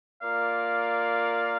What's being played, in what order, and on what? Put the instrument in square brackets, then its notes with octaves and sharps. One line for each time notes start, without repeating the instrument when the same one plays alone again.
[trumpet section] A#3 F4 A#4 D5 [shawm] F5